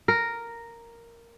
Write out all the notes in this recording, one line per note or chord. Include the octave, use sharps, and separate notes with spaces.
A#4